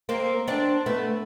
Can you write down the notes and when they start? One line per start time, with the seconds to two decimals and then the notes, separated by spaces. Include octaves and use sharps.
0.09 A#3 C4
0.48 C4 D4
0.86 A3 B3